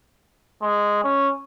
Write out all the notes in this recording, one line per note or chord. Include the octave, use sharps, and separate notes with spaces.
G#3
C#4